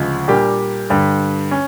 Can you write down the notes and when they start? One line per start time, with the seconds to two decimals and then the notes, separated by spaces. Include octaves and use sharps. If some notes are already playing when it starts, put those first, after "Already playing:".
Already playing: D2 C#3 F3 G#3
0.28 A#2 G3 A#3 D4 G4
0.90 G2 D3 G3
1.51 C#4